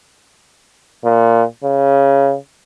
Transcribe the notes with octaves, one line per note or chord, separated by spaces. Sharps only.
A#2
C#3